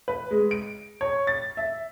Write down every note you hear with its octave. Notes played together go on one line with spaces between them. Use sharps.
B4
G#3
D7
C#5
A6
E5